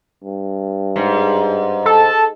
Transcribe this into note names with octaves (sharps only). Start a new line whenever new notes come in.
G2
G#2
A4 A5